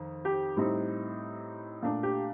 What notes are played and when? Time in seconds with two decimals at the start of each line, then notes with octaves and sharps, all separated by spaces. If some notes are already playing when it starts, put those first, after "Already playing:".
Already playing: F2 D#3
0.25 G4
0.56 A2 G3 C4 D#4
1.82 A#2 A3 D4
2.03 G4